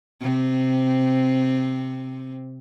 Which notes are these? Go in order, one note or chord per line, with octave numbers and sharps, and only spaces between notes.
C3 C4